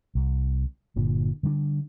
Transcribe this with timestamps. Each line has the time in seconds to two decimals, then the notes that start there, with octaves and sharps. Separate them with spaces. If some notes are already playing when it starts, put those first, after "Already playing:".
0.15 C2
0.96 G1 A#2 D3
1.43 D3 G3 A3 D4